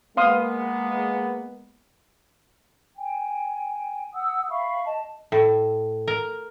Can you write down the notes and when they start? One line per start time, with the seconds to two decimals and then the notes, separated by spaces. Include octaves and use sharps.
0.17 G#3 A#3 B3 F5 C6 D#6
2.97 G5 G#5
4.14 F#5 D#6 E6
4.49 E5 F5 B5 C#6
4.85 D#5 A5
5.32 A2
6.07 A#4